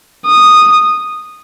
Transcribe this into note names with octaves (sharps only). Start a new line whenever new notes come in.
D#6